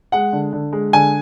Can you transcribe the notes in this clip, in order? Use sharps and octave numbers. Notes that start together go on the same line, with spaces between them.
G#3 F#5
D3
D3
G#3
D3 G#5